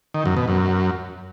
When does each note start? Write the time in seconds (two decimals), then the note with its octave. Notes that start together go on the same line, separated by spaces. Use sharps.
0.14 D#3
0.26 F#2
0.37 B2
0.48 F#2